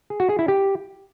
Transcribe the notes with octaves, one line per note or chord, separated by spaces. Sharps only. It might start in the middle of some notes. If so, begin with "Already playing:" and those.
G#4
F#4
G#4
E4
G4